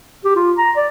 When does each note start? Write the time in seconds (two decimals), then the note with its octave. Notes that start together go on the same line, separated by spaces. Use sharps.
0.25 G4
0.36 F4
0.58 A#5
0.76 D5